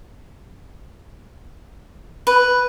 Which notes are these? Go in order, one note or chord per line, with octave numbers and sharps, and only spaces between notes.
B4